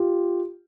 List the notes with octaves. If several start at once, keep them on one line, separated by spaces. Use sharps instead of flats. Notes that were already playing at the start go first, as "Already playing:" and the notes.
Already playing: F4 G4